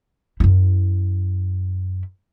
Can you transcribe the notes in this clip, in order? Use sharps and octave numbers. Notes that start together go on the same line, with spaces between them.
F#2 E4